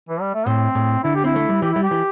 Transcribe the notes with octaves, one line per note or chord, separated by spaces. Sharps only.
E3
G3
A3
A2 C4
A2
D3 E4
G4
C4 E4
A3
G3
E3 G4
G3 E4
G4
E3